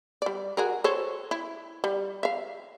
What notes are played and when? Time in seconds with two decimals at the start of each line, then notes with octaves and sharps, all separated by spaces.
0.22 G3 D5
0.57 F#4 G#4 A#4
0.84 A4 C5 C#5
1.31 E4
1.84 G3
2.23 E5 F5